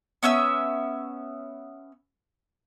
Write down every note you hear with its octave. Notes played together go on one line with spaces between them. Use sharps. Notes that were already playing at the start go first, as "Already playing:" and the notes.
B3 C#4 E5 E6